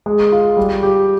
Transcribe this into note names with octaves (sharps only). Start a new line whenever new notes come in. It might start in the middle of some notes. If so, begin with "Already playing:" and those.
G#3
F4
G3
G4